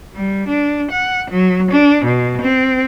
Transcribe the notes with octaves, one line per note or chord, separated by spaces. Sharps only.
G3
D4
F#5
F#3
D4
B2
C4